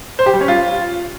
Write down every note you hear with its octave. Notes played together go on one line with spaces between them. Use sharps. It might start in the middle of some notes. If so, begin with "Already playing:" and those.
C5
G4
G3
C#4
F4